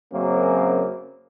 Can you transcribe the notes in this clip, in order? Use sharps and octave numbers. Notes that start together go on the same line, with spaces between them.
F#2 C#3 A#3 C4